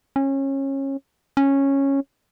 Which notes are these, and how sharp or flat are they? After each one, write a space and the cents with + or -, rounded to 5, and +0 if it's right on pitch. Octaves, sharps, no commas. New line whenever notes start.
C#4 -25
C#4 -10